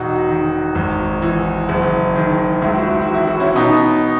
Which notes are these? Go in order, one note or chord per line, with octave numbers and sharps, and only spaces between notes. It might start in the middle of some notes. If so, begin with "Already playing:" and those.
Already playing: E1 D#4 F#4
D#3
G#1
E3
F#1
D#3
C#2 E4
F#4
E4
F#4
E3
E4
F#4
C#4 E4
B2 B3 D#4